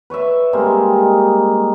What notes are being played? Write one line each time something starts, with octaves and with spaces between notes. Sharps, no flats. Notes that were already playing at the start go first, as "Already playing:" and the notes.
B4 C#5 D5 E5
G3 G#3 A#3 C4
D#4